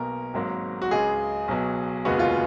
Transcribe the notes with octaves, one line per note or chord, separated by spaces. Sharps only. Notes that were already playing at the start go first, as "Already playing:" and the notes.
Already playing: B1 B2 A#3 A#4
G#1 G#2 F#3 A#3
F#4
C#2 C#3 G#3 G#4
B1 B2 F#3
F1 D#2 C#3 G#3 B3 F#4
F4